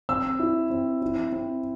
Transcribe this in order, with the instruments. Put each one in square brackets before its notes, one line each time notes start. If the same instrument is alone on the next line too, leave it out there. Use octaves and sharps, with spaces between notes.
[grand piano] C4 E6
E4
C4
E4
C4